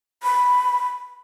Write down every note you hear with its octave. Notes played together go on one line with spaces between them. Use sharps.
B5